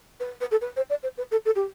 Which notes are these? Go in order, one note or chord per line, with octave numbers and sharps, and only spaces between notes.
B4
B4
A4
B4
C5
D5
C5
B4
A4
A4
G4